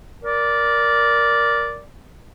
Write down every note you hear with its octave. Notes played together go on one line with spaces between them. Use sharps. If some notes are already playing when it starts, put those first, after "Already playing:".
A#4 D5